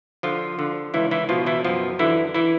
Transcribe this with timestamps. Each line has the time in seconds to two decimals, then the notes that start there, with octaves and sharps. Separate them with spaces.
0.23 D3 F3 F4
0.59 D3
0.94 C#2 E3 E4
1.11 E3 E4
1.29 B2 F3 F4
1.46 E3 E4
1.64 F#2 F3 F4
1.99 D3 E3 E4
2.34 E3 E4